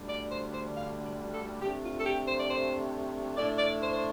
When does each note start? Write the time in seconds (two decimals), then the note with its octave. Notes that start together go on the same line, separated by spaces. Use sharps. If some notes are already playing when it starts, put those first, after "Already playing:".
Already playing: D2 D3 G3 D4
0.09 D5
0.30 C5
0.52 C5
0.74 F5
1.03 D5
1.32 A4
1.62 C3 A3 D4 G4
1.83 F4
1.98 A4
2.05 G4
2.27 C5
2.38 D5
2.49 C5
3.36 A2 A3 D4 D5
3.58 D5
3.80 C5
3.92 C5